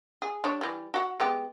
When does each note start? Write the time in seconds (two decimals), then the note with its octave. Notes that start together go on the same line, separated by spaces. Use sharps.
0.22 G#4
0.44 G3 D4 C#5
0.61 E3 G3
0.94 F#4 F#5
1.20 G#3 B3 G4